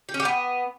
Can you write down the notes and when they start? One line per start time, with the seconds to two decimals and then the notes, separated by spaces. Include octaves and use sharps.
0.09 G4
0.14 C#4
0.20 G4
0.25 B3